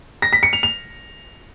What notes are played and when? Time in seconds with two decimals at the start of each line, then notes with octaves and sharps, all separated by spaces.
0.22 A#6
0.33 B6
0.43 C#7
0.53 F7
0.63 F7